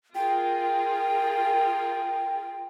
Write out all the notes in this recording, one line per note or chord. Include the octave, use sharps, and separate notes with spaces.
F4 G#4 A#4 G5